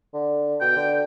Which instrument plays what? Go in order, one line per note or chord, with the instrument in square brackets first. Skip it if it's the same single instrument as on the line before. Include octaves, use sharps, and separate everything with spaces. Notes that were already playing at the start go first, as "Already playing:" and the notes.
[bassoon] D3
[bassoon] B2 [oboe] G5
[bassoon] D3